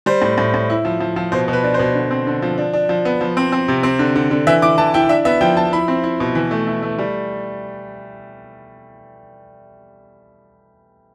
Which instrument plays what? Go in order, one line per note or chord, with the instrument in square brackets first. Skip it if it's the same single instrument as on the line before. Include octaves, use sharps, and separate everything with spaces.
[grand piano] G3 C5
A2
A2
A2
E4
F3
F3
F3
B2 C5
B2
B4
D4
B2 C5
D3
C4
D3
F3
D4
D4
F3
B3
F3
C4
C4
C3
C4
D3
D3
D3
E3 E5
E4 D6
E3 A5
E4 G5
D4 E5
B3 E5
F3 G5
F3 A5
E4 B5
C4
E4
B2
E3
A3
E4
A3
G3